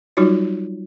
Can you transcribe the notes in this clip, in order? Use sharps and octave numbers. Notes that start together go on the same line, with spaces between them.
F#3 G3 D#4 F4 F#4 C#5